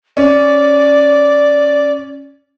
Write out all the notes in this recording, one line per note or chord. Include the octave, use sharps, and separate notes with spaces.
C#4 D5